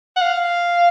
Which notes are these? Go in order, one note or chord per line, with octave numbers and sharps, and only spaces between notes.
F#5
F5